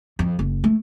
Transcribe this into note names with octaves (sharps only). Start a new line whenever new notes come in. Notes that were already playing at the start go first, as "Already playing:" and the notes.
F2
F#1
A3